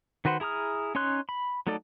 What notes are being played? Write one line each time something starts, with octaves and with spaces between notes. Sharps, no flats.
D#3 F#4 B4 C5 F#5
E4 G#4 A#5 D#6 F6
C#4 D#4 C#5 C6 F#6
B5
F#3 A3 D#4 A4 D5